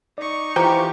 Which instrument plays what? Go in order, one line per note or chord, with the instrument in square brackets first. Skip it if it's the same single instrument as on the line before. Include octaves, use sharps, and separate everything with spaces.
[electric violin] D#4 C#6 [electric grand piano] D5
[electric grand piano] E3 F4 [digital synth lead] G4 [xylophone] C5 A#5